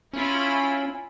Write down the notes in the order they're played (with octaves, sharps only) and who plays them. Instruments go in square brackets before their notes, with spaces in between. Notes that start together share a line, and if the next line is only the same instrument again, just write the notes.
[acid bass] C#4 [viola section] E4 F4 B5